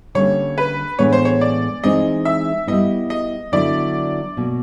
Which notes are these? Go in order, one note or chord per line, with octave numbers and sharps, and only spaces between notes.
D3 G3 A#3 C#4 C#5
B4
A2 E3 G#3 B3 D4 C#5
C5
C#5
D5
E3 G#3 C4 D#4 D#5
E5
G3 B3 E4 D#5
D#5
D3 F#3 B3 E4 D5
B2 F#3 A#3